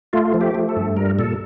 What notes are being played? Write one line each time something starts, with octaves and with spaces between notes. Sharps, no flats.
A3 F4
F3
G4
A3
A4
G2
G3 A#4
A#2 A4